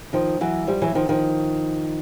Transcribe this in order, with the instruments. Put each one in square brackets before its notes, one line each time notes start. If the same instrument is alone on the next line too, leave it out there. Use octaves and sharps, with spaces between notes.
[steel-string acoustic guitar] D#3 F3
E3 F#3
F3 G3
E3 F#3
D#3 F3
D#3 F3